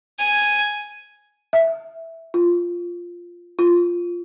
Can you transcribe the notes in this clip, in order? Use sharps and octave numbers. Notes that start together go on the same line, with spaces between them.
G#5
E5
F4
F4